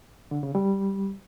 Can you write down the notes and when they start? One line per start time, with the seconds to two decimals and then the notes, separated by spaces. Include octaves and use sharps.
0.31 D3
0.43 C#3
0.55 G3